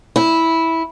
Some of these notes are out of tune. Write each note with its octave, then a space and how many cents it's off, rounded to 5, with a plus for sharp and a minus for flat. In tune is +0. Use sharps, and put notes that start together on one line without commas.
E4 -10